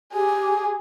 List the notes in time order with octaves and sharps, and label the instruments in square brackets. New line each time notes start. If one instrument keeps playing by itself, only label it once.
[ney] G4 [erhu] G#4